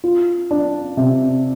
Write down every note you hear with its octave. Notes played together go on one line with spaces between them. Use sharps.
F4
D4
C3